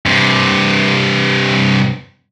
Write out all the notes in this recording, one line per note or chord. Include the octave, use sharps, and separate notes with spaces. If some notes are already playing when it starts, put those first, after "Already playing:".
G2 C3